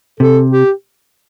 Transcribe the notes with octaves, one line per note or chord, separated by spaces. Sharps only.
C3 A4
G4